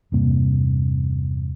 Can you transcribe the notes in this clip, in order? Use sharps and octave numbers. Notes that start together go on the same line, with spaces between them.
E2 G2 C3 A#3